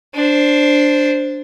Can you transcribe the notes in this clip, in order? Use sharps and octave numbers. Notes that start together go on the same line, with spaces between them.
D4 C5